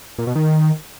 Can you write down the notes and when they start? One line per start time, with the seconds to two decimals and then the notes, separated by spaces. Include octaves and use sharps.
0.18 A#2
0.27 B2
0.35 D#3